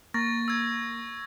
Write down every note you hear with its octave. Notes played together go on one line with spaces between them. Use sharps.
A#3 C#6 A6 A#6
E6 G#6